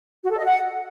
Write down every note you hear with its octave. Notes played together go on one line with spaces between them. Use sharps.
F#4
A4
D#5
F#5